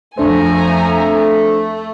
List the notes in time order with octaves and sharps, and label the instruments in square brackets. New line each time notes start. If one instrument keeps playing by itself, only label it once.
[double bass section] F2 F3 [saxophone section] A3 [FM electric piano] D4 C5 [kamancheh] G#5 A#5